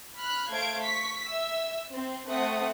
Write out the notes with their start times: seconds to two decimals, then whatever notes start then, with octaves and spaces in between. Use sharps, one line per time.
0.19 B5 F6 F#6
0.52 A3 C5 F5 G#6 D7
0.85 C#6 B6
1.27 E5 E6
1.90 C4
2.29 A3 C4 F#5 D#6